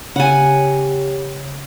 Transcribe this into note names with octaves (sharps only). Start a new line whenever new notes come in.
C#3 G4 F#5 G#5